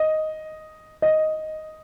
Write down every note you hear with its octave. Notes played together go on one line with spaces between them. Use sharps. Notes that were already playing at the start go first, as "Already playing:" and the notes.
Already playing: D#5
D#5